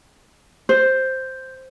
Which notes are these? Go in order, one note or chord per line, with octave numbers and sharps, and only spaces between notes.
C5